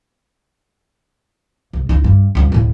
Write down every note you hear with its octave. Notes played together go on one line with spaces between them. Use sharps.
C2
C#2 D#4
G2
C#2 G3
D1 A2